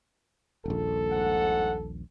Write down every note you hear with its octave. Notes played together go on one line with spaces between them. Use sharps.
D#1 A#1 A4
G#2 F#5